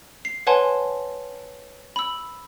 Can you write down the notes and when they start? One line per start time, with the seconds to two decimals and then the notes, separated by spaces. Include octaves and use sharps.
0.25 C7
0.47 B4 C#5 F#5 G#5 A5 C6
1.96 B5 E6